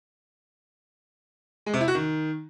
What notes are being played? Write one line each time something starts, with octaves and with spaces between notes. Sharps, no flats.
G#3
C3
E4
F#4
D#3